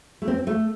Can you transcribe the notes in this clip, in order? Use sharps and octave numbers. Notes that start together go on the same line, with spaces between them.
A3
C4
C4
A3